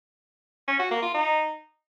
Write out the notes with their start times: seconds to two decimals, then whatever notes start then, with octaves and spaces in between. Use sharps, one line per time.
0.67 C#4
0.79 F#4
0.91 A#3
1.02 F4
1.14 D#4